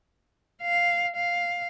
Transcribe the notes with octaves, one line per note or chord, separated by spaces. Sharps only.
F5
F5